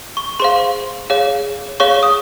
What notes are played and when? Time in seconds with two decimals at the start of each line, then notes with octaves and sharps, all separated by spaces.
0.17 C#6
0.39 G#4 C5 F5 C6
1.10 G#4 C#5 F5
1.80 G#4 C#5 F5 C#6
2.03 D#6